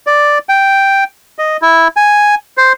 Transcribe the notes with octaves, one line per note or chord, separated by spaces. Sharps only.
D5
G5
D#5
E4
G#5
C5